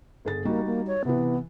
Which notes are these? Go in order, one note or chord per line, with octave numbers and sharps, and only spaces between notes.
G1 G#4 A6
G3 A#3 D#4 F#4
A#3
C#5
C3 E3 B3